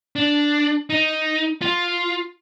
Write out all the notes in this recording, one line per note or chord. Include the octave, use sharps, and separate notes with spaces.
D4
D#4
F4